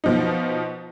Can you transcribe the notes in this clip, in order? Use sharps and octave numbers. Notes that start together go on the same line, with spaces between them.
B2 F3 D#4